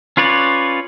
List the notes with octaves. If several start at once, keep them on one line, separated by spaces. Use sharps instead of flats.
C#4 F4 B4 C#5 D5